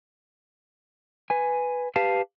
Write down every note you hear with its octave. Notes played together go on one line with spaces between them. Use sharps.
B4 G#5
G4 B4 F5 A5